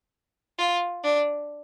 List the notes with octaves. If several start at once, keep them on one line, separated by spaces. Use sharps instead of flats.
F4
D4